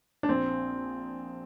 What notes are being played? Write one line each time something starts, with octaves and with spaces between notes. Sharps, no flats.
D4
A#1 C4